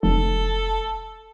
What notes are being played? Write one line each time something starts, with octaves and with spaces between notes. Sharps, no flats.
F1 A4